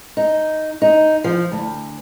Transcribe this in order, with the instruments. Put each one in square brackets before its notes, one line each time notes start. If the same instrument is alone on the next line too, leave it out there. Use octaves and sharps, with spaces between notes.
[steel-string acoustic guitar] D#4
D#4
F3
D2